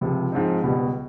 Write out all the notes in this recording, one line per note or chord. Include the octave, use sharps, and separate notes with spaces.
C#2 C3 F3
G#2 F3 G#3 C4 D#4
C#2 B2 G3